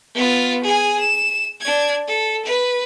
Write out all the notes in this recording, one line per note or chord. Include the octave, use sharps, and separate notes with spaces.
B3 F4
G#4 G#5
E7
D4 G#6
A4
B4